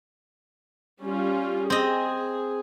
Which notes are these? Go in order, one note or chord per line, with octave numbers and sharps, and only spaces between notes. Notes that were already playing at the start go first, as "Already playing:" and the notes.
G3 C#4 F4
C4 G#4 D#5